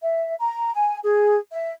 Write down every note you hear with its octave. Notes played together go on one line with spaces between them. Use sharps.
E5
A#5
G#5
G#4
E5